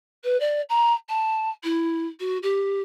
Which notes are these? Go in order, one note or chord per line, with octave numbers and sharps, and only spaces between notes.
B4
D5
A#5
A5
E4
F#4
G4